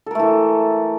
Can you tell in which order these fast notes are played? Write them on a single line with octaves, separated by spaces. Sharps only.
A4 A#4 A3 E3